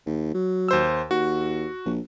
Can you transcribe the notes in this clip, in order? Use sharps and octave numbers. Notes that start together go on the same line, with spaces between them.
D#2
F#3
D#2 C5 E6
D#2 F#4
A#1